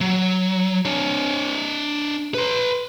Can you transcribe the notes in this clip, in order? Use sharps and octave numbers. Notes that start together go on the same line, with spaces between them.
F#3
D4 C#5
B4 C6